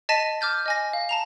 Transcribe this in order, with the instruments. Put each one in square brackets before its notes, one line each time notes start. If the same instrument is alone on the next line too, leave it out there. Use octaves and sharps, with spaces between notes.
[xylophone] D#5 A5 A6 B6 D#7
D6 F6 G6 A6
D#5 G#5 A#6
F5
A5 A#5 F7